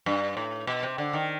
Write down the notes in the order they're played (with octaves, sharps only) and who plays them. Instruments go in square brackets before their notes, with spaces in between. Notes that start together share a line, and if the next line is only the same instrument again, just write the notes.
[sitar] G2
A2
B2
C3
D3
D#3